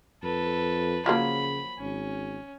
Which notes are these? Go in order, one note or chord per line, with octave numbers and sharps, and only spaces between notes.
F2 A4 B4
C#3 F3 F#3 A#3 B5
G#1 C#4